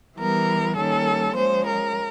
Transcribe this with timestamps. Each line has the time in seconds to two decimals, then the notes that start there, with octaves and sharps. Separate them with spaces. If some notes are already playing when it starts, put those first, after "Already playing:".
0.19 E3 G3 B3 A#4
0.77 D#3 G3 A#3 C#4 A4
1.35 F3 G#3 C#4 C5
1.65 A#4